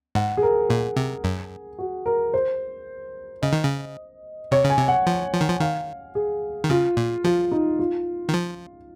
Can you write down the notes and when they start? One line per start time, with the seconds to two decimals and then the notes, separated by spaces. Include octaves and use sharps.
0.15 G#2 F#5
0.37 G#4
0.43 A#4
0.69 A#2 G#4
0.96 C3
1.24 F#2
1.78 F#4
2.06 A#4
2.34 C5
3.42 C#3 D#5
3.53 D#3
3.64 C#3
4.52 C3 C#5
4.64 C#3
4.70 G#5
4.78 C3
4.88 F#5
5.07 F3
5.33 F3
5.41 D#3
5.49 F3
5.60 D#3 F5
6.15 G#4
6.64 D#3
6.70 C#3 F4
6.97 A#2
7.24 F3 F4
7.52 D#4
7.79 F4
8.29 D#3
8.34 F3